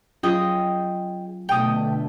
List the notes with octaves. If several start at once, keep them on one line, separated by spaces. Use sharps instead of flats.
F#3 C#4 F4 G#4 D#5 G5
B2 D3 A3 G5 D#6